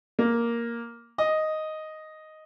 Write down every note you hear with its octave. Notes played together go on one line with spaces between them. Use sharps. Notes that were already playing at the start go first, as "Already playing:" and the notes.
A#3
D#5